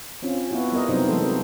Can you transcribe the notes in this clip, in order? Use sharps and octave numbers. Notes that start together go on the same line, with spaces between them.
C4 C#4 F4
B3 E4 F#4
G3 B3 A#4 D#5
C3 F#3 B3 C4 D#4 C5
E3 F#3 G#3 A#3 A4 C5